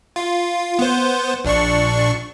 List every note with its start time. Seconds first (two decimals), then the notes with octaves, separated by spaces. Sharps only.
0.16 F4
0.79 B3 C5
1.45 A#1 D4 C#6